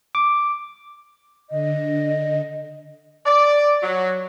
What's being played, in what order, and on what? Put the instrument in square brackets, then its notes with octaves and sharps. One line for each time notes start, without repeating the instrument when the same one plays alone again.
[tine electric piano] D6
[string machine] D3 [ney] D#5
[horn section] D5
F#3